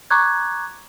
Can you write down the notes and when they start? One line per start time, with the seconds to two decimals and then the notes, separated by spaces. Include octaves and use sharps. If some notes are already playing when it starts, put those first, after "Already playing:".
0.10 A#5 C#6 D6 F#6 G#6